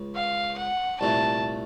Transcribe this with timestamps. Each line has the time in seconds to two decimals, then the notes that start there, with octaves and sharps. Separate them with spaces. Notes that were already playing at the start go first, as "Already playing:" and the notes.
Already playing: C#2
0.16 F5
0.58 F#5
1.01 C2 A#2 A3 A5